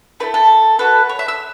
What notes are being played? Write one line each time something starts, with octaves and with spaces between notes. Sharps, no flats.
A3 E4 A4 B4
A4
A3 F#4 A4 B4
C#5
E5
E6